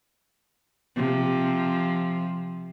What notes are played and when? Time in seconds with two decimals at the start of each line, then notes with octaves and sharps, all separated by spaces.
0.96 C3 F3